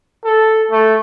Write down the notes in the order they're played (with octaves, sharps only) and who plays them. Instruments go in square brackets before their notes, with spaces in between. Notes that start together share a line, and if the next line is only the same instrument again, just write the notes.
[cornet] A4
A3